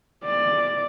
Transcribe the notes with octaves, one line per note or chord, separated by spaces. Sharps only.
D5